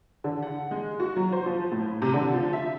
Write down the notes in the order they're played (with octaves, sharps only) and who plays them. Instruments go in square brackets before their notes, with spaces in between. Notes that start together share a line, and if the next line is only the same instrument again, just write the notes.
[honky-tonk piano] D3
F#5
G#3
F#4
F#3
C5
F3
A2
C3
D3
F3
E5